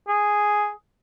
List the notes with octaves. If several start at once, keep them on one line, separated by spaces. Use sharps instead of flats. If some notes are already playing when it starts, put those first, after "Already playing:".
G#4